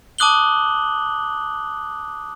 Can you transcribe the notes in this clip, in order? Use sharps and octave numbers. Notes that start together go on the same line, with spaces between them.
A5 D6 D#6 F#6 F#7 G7